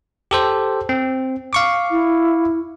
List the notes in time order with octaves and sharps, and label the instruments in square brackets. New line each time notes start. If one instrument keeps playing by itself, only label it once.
[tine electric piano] G4 A4 C5
C4
F5 C#6 D6
[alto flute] E4